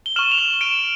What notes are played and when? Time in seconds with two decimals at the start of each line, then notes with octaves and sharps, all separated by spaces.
0.06 G7
0.16 C#6 F6 E7 F#7
0.32 F7
0.38 E7 F#7
0.61 D7 E7